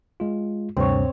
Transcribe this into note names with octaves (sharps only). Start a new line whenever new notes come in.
G#3 F4
D2 G2 C3 C4 C#5